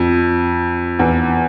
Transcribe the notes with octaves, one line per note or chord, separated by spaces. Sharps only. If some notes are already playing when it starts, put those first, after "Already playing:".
Already playing: F2
E2